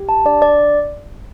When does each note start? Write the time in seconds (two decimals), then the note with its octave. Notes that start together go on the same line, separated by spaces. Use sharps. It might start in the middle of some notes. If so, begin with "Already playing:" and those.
Already playing: G4
0.09 A5
0.25 D4 D5
0.42 D5